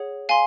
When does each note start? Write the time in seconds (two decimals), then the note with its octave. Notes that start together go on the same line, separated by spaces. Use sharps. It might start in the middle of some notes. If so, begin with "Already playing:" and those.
Already playing: G#4 C#5 F#5
0.29 F5 G#5 C6